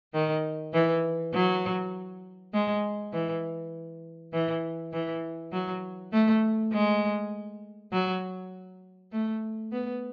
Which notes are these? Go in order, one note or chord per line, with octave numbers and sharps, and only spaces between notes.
D#3
E3
F#3
G#3
E3
E3
E3
F#3
A3
G#3
F#3
A3
B3